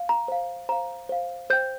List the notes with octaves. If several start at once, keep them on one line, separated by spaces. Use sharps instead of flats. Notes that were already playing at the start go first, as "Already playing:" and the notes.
Already playing: F5
A#5
C5 F5
C5 F5 A#5
C5 F5
C5 G5 G6